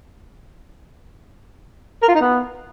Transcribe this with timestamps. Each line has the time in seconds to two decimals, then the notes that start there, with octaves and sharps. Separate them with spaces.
2.02 A#4
2.09 F4
2.15 D#4
2.21 B3